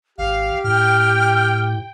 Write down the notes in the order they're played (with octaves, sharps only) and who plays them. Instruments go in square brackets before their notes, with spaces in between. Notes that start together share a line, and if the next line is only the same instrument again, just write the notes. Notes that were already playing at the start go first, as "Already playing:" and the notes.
[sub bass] G#1 [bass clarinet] G4 [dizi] F5
[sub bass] A2 [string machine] G5 [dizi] F6